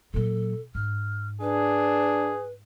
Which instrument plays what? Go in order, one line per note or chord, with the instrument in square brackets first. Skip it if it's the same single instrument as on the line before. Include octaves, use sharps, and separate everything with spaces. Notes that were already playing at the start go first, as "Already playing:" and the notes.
[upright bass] A#2 F#3 [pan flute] A4
[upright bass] G#2 [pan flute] F6
[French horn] D4 [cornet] G#4 [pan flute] B4